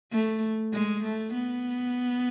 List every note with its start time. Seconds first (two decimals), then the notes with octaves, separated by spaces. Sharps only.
0.12 A3
0.73 G#3
1.03 A3
1.33 B3